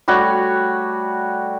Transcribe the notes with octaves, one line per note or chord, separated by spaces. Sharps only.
G3 A3 F#4 C#5